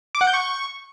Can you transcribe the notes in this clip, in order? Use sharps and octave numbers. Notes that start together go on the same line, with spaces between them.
D6
F#5
G6
C#6